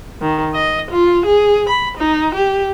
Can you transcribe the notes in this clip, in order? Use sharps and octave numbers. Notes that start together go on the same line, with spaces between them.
D#3
D#5
F4
G#4
B5
D#4
G4